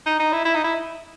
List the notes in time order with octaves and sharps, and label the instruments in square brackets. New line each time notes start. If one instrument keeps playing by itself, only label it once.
[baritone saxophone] D#4
D#4
E4
E4
D#4
E4